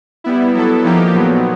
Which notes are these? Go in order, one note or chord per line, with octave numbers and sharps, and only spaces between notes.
G3 B3 E4
F#3 B3 E4 A4
F3 A#3 D#4 G4
A#2 F#3 B3